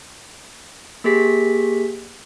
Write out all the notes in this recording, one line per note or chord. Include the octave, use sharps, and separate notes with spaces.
A#3 G4 G#4 B6